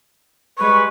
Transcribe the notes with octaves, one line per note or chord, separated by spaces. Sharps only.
G3 G#3 B4 C#6